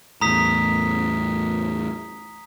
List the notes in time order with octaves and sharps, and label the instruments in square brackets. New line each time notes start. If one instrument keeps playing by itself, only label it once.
[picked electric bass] E2 A2 [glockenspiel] A#5 D#6 B6